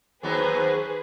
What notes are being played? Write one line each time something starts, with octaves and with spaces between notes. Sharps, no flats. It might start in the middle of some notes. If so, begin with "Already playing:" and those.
D#2 F#3 B3 G#4 B4 C5